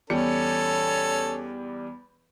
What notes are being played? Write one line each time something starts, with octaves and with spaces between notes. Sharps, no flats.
E2 G3 C#4 A4 C#7